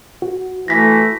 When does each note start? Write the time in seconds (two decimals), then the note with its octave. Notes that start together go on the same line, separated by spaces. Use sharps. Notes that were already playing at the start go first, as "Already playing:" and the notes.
0.22 F#4
0.68 E3 A3 A#6 B6